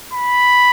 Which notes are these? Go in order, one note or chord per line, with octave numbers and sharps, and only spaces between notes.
B5